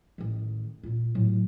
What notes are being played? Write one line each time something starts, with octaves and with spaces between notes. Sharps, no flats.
A1 D#3
A#2 F4
A2 F#3